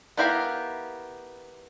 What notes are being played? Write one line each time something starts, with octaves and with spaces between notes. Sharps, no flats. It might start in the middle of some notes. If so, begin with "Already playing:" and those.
B3 E4 G4 A#4 F5